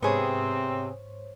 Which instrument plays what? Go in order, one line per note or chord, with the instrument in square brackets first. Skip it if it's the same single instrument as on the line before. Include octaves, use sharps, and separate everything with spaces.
[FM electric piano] G#2 C5 C#5 [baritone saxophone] C3 [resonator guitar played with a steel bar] B3 G#4 [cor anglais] C4